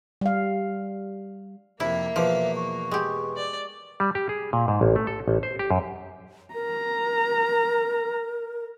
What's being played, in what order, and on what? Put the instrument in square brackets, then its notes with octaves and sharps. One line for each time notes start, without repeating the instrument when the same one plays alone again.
[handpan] G3 F5
[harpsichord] F2 C3 [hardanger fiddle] A#3 [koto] E4 [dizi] E5
[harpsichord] E2 B2 D6 [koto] F3
[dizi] C#6
[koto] G#3 G4
[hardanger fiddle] D5
[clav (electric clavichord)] G3
G4
G#4
A#2
G#2
A1
A3
A4
A1
C5
G4
F#2
[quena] A#4 [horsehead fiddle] A#5